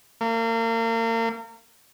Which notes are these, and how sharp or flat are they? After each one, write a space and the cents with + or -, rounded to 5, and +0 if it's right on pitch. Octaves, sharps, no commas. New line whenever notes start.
A#3 -35